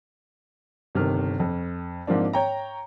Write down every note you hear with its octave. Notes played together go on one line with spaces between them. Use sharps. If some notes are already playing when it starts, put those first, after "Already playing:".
G1 C3 D#3 F6
F2
G#2 F3 A#3 C4 D4
C#5 G5 A#5